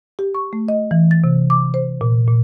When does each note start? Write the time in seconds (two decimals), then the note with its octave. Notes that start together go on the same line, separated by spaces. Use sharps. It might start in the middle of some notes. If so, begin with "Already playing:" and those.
0.19 G4
0.35 C#6
0.53 A3
0.68 D#5
0.91 E3
1.11 A6
1.24 C3
1.50 D6
1.74 C5
2.01 A#2
2.28 A#2